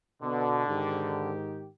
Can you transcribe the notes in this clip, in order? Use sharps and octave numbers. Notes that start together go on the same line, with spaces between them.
B2 D3
G#2 D#3 G4